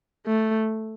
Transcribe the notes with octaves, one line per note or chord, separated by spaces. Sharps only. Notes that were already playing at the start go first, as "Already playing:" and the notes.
A3